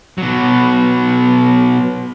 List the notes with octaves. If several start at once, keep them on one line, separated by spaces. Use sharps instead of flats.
B2 F#3